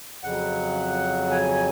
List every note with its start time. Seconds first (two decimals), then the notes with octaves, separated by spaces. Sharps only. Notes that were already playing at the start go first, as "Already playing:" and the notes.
0.23 F2 C#3 F#3 F#5
1.31 G#5